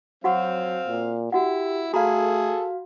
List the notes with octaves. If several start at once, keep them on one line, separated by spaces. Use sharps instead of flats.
F#3 C4 F#4 F5 F#5 C#6
A#2
E4 F#4 G4 F#5
A3 F#4 G#4 A4 F5 A#5 B5